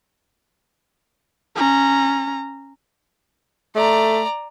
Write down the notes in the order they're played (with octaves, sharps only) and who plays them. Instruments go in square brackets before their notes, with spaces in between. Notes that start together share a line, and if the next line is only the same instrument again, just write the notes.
[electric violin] C#4 A#5
[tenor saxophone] A3 [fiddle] D5 A#5